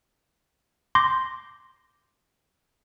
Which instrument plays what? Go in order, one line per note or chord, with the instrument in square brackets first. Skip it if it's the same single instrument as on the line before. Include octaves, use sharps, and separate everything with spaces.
[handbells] C6 D6 G6 A#6